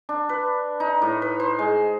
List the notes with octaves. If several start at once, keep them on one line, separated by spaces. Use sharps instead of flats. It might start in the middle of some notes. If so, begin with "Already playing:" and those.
D4
B4
D#4
A2
B4
C5
G#3